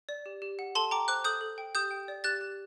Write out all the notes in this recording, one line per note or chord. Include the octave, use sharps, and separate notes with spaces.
D5
G4
G4
F#5
A4 A5 C6
G5 A#5 D6
C5 D6 F#6
A4 D#6 G6
A4
G5
G4 D#6 G6
G5
D5
G4 F#6 A6
G4